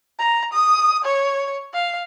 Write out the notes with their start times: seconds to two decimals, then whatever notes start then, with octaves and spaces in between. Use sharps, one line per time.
0.19 A#5
0.53 D#6
1.05 C#5
1.73 F5